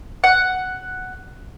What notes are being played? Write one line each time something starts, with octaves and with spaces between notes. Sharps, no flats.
F#5